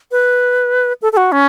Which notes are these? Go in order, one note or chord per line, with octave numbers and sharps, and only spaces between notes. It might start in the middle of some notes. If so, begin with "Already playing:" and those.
B4
A4
A4
F#4
C#4